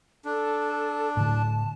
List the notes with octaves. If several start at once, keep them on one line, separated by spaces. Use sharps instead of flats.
D4 A4
A2 D3 A5